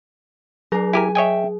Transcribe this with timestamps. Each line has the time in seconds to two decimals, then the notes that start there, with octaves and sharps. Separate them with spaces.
0.72 F#3 D4 G#4 A#4
0.93 E4 G4 A#4 G#5
1.15 C#5 D#5 E5 G5 G#5